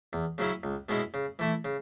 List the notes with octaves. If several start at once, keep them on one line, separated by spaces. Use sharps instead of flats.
E2
C#3 F#3 C#4 E4
C#2
B2 G#3 C#4 E4
C#3
E3 A3 E4
C#3